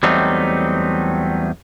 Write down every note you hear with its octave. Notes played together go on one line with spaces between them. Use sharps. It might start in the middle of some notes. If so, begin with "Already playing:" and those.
E2 F#3 G3 A3 C4 D#4